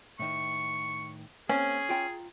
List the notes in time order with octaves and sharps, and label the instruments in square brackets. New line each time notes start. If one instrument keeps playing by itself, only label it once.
[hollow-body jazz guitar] A2 D#3 [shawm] C#6
[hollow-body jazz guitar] A#3 C4 C#5 [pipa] C#4 [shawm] G#4
[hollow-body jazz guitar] F4 G5 A#5